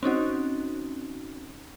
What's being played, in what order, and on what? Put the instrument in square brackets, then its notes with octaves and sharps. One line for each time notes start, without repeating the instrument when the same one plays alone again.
[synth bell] C4 C#4 D#4 F#4